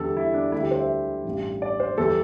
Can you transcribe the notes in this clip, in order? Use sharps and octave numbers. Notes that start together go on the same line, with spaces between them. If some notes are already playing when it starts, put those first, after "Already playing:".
Already playing: E2 D3 G3 A4
E4
D4
D2 D3 G3 E4
G4
C5
E5
A1 G2 G3
D5
C5
E2 E3 G3 A4